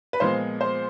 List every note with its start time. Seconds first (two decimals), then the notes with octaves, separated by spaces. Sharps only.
0.13 B4
0.20 A#2 F3 G#3 B3 C5
0.61 C5